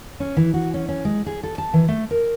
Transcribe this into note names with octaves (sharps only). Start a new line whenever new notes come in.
C#4
E3
F#4
C#4
C#4
G#3
G#4
A4
A5
E3
A3
A#4